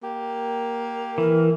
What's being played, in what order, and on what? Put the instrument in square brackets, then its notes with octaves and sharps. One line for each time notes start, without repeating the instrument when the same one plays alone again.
[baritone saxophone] A#3 [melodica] G4
[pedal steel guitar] E3 [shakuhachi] A#4